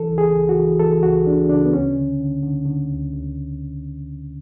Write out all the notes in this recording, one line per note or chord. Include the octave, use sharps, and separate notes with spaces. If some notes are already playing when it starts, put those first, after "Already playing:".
Already playing: E3 A4
C#2
G#4
C#2
F#4
E3
E3 A4
C#2 F#4
C#3 D4
C#3 D4
B3
D2 C#4
D3
D3
D3
D3
D2
D2